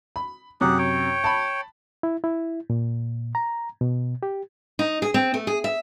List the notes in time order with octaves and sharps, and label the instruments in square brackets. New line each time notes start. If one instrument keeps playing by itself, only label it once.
[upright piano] B5
[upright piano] F#2 C3 [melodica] G4 G#4 F#5
[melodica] C#5 G5
[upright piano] A5 B5
[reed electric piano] E4
E4
A#2
A#5
B2
G4
[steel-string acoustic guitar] D#4
G#4
C4
A3
G#4
E5